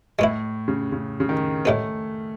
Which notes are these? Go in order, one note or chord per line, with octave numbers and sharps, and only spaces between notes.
A2 G#3 B3 E4
C#3
C#3
C#3
D#3
A2 G#3 A3 B3